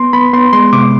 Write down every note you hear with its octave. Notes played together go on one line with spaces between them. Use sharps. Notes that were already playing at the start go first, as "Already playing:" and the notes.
Already playing: B3 C6
B3 B5
B3 C6
G#3 C6
C3 D6